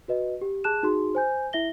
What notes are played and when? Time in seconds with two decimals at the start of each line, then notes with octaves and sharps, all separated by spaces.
0.08 F#4 B4 D#5
0.41 G4
0.64 G#4 A5 F#6 E7
0.83 D#4 F#4 G#4 C6
1.15 C5 G#5 G6
1.53 E4 E5 A#6 G7